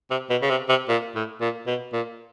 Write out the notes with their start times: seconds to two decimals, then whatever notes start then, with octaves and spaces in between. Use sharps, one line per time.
0.11 C3
0.30 B2
0.42 C#3
0.50 C3
0.69 C3
0.89 A#2
1.15 A2
1.41 A#2
1.67 B2
1.93 A#2